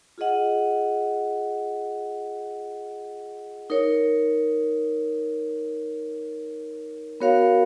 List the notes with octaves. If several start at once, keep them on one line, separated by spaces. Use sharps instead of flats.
F4 G#4 D#5 F#5
D#4 A#4 C#5
B3 F#4 A#4 C#5 F5